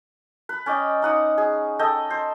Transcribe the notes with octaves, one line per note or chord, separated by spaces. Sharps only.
B4
C#4 D5 D#5 G5
D#4 F#5 D#6
G#4
A4 D#5 G5
C5